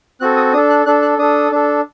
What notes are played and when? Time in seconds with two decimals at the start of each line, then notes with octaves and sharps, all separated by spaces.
0.20 C4 F#4 A4 F#6
0.37 D#6
0.53 D4 D#6
0.57 A4
0.70 F#6
0.86 D4 A4 F#6
1.02 F#6
1.18 D4 A4 D#6
1.51 D4 A4